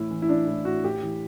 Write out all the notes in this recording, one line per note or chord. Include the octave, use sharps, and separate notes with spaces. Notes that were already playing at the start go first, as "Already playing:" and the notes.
Already playing: A2 E3 E4
E3
E4
E3 D4
A2 E4
A2 F#4
A2 G4
E3